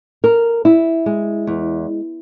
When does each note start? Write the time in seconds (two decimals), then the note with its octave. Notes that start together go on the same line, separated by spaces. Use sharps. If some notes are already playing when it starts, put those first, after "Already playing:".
0.24 A#4
0.65 E4
1.06 G#3
1.47 E2